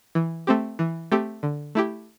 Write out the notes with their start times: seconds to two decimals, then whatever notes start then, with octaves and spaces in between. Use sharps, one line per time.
0.15 E3
0.47 A3 C4 G4
0.79 E3
1.12 A3 C4 G4
1.43 D3
1.75 A3 E4 G4